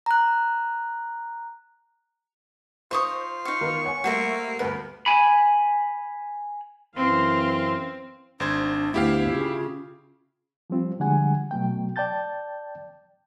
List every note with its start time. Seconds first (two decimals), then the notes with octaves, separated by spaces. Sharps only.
0.06 A#5 F#6
2.91 D#4 F4 C5 C#6 D#6
3.45 D#4 F5 C#6
3.61 D#3 B3
3.84 C#5 F#5 G#5
4.04 G3 A3 A#3 F#4 C5 E5
4.59 D2 G2 B3 A#4 B4
5.06 G#5 B5
6.96 F#2 E3 C4 F5 C6
8.40 G#1 D4 C5 G#6
8.94 D2 B3 E4 G4 F5
9.30 C#3 F4
10.70 F3 G3 C4 F4
11.00 D3 F3 G3 G#3 F#5 G#5
11.51 B2 F#3 A3 G5
11.96 D5 G5 A5 G6 A6